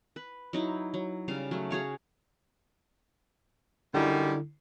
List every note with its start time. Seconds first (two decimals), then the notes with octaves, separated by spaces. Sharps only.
0.16 B4
0.53 F#3 D#4 E4
0.94 F#3
1.28 C#3 G3 F5
1.51 F#3 A3
1.71 F#4 G#4 C#5 F5
3.94 F#2 D3 D#3 G3 E4